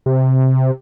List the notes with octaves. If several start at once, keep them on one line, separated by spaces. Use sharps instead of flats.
C3